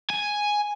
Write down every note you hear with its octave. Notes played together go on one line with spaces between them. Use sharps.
G#5